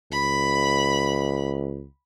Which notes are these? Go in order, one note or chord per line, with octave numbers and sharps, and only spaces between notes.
C#2 B5